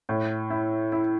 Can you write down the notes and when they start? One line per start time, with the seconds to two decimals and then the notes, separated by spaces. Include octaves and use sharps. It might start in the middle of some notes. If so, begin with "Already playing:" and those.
0.09 A2
0.50 E4
0.92 E4